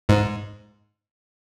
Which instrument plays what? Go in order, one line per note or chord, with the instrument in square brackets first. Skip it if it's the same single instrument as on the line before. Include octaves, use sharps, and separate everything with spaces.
[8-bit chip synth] G#2